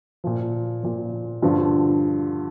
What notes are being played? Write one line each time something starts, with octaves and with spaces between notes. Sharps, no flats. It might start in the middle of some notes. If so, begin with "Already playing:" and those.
A#2 F3
A#2 F3
G2 D3 F3